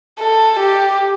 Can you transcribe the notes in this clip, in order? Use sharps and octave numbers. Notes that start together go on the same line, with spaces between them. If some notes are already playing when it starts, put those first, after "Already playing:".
A4
G4